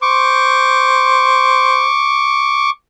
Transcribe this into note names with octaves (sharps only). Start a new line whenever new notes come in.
C5 C#6 D6